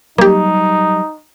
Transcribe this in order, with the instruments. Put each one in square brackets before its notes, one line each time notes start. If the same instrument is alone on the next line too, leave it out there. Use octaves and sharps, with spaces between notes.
[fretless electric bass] F#3 G3 [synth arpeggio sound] A#3 G4 [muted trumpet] D#4